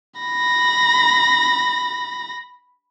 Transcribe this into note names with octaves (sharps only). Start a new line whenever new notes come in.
B5 A#6